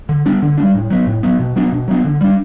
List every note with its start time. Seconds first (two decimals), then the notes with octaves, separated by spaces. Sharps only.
0.09 D3
0.26 G3 B3 D4
0.42 D3
0.58 G3 B3 D4
0.74 A2
0.90 F#3 B3
1.07 A2
1.23 F#3 B3
1.39 B2
1.56 F#3 B3 D4
1.72 B2
1.88 F#3 B3 D4
2.05 D3
2.21 G3 D4